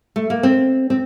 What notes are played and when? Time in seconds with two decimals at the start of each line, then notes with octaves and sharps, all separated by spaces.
0.16 A3
0.30 A#3
0.43 C4
0.90 C4